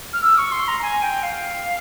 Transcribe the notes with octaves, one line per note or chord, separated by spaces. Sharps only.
F6
E6
C#6
C6
A#5
G#5
G5
F5